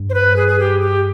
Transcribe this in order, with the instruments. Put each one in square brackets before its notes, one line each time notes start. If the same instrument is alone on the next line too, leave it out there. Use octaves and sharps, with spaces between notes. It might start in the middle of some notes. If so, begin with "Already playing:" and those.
Already playing: [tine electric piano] G2
[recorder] C5
B4
G#4
G#4
G4
G4